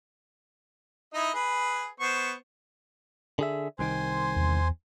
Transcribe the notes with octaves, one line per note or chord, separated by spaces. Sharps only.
D#4 E4 D#5
G#4 B4
B3 C5 C#6
D3 G#4 E5
C2 D#3 C5 G#5 C6
E2